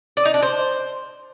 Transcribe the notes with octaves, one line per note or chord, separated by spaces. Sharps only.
D5
D#4
D4
C5